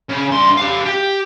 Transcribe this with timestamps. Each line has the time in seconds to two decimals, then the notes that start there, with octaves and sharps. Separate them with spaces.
0.09 C#3
0.32 G2 C6
0.57 G4 F5
0.86 G4